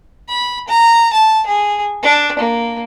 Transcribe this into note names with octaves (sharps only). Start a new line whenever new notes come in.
B5
A#5
A5
G#4
D4
A#3